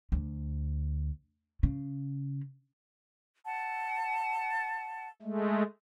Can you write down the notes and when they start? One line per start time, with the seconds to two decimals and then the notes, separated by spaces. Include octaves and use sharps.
0.12 D2
1.63 C#3
3.46 F#5 A5
5.22 G#3 A3